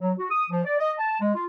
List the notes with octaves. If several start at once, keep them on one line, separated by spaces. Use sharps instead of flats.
F#3
F#4
D#6
F3
D5
D#5
A5
G#3
F4